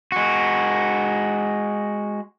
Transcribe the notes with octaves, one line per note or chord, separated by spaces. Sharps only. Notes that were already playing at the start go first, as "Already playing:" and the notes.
G#3 F#4